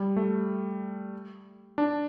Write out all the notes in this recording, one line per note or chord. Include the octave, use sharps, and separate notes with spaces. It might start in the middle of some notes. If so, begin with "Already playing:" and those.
Already playing: G3
A3
D4